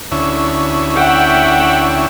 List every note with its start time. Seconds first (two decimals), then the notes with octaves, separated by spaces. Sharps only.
0.11 D2 C#4 E4
0.94 E5 F#5 G5